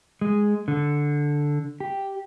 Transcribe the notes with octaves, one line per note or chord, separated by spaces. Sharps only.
G#3
D3
G4